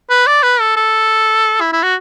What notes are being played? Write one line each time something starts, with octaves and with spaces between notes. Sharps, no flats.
B4
D5
B4
A4
A4
E4
E4
F#4